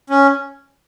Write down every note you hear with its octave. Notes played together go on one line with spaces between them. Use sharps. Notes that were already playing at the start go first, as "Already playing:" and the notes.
C#4